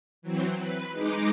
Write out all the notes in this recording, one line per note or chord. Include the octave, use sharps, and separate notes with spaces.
E3 F#3 C4
B4
G#3 D#4 D6